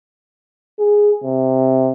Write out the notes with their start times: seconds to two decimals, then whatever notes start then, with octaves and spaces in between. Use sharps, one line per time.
0.79 G#4
1.24 C3